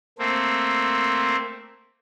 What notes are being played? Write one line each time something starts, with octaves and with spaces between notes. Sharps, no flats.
A3 A#3 C4